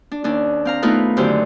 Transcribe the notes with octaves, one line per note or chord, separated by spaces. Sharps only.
D4
D#2 C#4 D4
C4 F5 A#5
A3 B3 D#4 F4 A#4 B4
F#2 D3 D#3 G4 C5